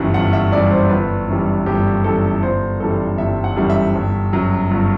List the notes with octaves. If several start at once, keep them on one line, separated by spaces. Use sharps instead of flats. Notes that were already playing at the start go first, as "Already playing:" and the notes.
Already playing: G1 F#2 E3 G3 F#5
G1 F#5
E5
F#2 E3 G3 D5
C5
G1 B4
F#2 E3 G3
G1 G4
F#2 E3 G3 A4
G1 C5
F#2 E3 G3 A4
G1 E5
F#5
F#2 E3 G3
E5
G1
F#2 F#3
G1